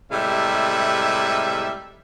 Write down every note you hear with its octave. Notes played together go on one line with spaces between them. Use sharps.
A2 C3 G3 G#3 E5